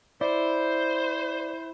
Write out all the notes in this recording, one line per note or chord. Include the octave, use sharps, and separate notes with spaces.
E4 C5 D5